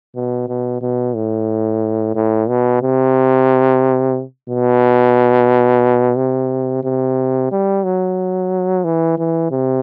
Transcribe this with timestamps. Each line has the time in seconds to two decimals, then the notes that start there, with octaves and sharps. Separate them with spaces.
0.15 B2
0.48 B2
0.81 B2
1.15 A2
2.15 A2
2.49 B2
2.82 C3
4.50 B2
6.17 C3
6.84 C3
7.52 G3
7.84 F#3
8.84 E3
9.18 E3
9.51 C3